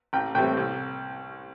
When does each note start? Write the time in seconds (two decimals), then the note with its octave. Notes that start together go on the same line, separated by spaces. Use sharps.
0.13 A1 G5
0.35 A2 E3 G3 C4 G5
0.57 C2